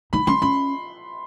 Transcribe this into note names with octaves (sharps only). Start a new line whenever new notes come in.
D#4 B5
C#4 C6
C#4 B5